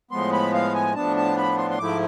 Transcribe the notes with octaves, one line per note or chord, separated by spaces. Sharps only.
A2 F3 G#3 B3 C6
B5
F5
G#5
A2 F3 B3 D4 A5
A5
B5
C6
C6
G#2 F3 A3 E4 D6